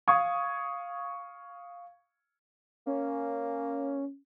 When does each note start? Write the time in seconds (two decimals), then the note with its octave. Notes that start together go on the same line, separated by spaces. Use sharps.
0.08 F5 C#6 D#6 G#6
2.87 A#3 C#4